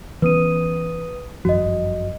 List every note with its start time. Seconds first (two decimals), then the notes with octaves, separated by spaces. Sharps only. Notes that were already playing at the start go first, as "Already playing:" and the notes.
0.22 E3 B3 C#4 B4 D#6 D#7
1.45 G1 F#2 F3 F#4 D#5